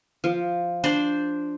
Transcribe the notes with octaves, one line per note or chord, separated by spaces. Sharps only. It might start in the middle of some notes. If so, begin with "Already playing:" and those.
F3
D4 C5 D5